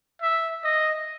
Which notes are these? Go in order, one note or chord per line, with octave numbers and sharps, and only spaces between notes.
E5
D#5